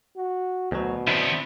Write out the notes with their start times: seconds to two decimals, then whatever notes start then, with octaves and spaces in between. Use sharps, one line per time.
0.16 F#4
0.72 D2 B2 F#3
1.07 D#3 B3 C4 D4 E4